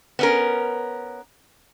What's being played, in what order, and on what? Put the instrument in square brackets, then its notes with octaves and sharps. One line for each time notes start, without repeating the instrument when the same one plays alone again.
[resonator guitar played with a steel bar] B3 C#4 A#4